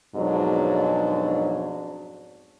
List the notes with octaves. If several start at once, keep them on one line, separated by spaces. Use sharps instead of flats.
F2 G#2 B2 F#3 D4